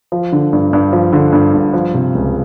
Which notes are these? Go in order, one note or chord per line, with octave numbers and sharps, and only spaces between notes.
F3
D3
G2
G2
F3
D3
G2
G2
F3
C3
C#2